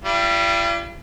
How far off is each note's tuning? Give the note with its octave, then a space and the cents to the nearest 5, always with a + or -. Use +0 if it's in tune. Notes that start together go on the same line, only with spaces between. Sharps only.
G3 +0 F4 -45